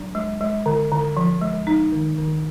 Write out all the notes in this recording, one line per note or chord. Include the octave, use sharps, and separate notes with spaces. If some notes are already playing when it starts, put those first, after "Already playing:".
Already playing: F#3 D4
G#3
G#3
D3
D3
F3
G#3
A#3 D#4
D#3
D#3